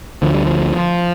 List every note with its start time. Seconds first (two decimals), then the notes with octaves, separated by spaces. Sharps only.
0.22 D2 D3 F3
0.34 G3
0.46 F3